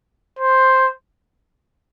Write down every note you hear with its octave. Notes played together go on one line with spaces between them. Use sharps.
C5